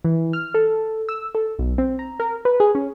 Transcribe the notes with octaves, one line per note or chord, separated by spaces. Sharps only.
E3
F6
A4
E6
A4
B1
C4
A#5
A#4
B4
G#4
C#4